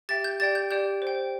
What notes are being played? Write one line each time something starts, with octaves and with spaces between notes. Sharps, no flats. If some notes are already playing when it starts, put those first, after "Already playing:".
G4 E5 G5 A6
G6
G4 D5 G5 A6
G6
G4 D5 G5 G6
C5 G5